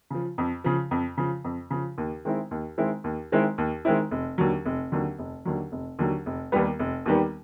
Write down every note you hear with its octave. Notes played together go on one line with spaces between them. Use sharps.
C#3 F3
F2
C#3 F3
F2
C#3 F3
F2
C#3 F3
D#2
D#3 G#3 C4 E4
D#2
D#3 G#3 C4 E4
D#2
D#3 G#3 C4 E4
D#2
D#3 G#3 C4 E4
F1
D#2 D3 F#3
F1
D#2 D3 F#3
F1
D#2 D3 F#3
F1
D#2 D3 F#3
F1
D#2 D#3 G3 B3
F1
D#2 D#3 G3 B3